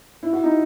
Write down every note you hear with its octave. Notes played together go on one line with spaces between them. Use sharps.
E4
F#4
D#4